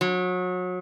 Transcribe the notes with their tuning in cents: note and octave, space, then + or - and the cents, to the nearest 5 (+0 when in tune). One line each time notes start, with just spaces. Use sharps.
F#3 -30